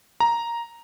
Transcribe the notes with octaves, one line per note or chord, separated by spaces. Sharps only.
A#5